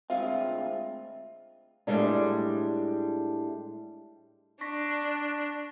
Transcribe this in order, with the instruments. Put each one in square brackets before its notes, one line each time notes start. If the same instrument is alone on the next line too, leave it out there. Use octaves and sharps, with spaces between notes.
[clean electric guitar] D2 G#3 C4 [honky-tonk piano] F4 [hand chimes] E5
[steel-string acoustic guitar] A2 G3 G#3 D4
[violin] D4 [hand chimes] C#6 A#6 B6